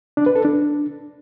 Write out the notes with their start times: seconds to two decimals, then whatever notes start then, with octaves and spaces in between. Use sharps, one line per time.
0.17 D4
0.26 B4
0.36 A4
0.45 D4